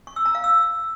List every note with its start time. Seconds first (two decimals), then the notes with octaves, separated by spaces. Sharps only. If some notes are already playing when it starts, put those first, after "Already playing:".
0.07 C#6
0.16 E6
0.26 A#5
0.35 F5
0.44 E6